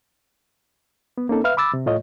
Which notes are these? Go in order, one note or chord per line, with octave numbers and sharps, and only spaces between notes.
B3
A#3 C4 C#4 D#4 A4
B4 E5 F5 F6
B5 D6 E6 A6
C3
A2 A3 F4 C#5 D#5